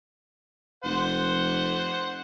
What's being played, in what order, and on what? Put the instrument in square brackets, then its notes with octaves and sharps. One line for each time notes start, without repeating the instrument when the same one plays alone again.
[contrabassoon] F1 [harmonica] C5 F#5